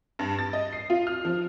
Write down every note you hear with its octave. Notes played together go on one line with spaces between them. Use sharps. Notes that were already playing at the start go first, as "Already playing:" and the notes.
G2
A6
D#5
C7
F4
F6
F3